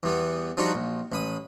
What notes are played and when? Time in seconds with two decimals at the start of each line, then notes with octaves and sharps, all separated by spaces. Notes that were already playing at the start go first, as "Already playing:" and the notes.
0.03 E2 G3 B3
0.57 F3 G3 D4 D#4 F#4 G4
0.74 A#1
1.12 A1 B5 D#6